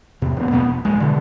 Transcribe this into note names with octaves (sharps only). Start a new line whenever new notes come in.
E2 C3
D1 B3
E2 B2 A#3 B3
F1
D1 G#3
B2 D3